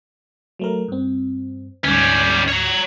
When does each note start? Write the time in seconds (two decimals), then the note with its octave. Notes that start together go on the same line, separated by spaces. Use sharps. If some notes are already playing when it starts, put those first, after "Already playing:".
0.59 F#3 A3 A#4
0.88 G2 C4
1.84 D2 G#2 G3 C#4
2.48 C#5 A#5